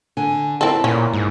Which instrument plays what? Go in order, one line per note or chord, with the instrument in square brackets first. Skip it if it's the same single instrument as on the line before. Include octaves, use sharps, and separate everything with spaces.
[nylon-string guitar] D3 G#5
[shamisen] C4 A4 [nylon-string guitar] E4 A#4 D5
[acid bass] A#2 [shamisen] C#4
[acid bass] G#2